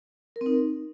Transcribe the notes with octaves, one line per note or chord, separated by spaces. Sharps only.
A#4
C4
D#4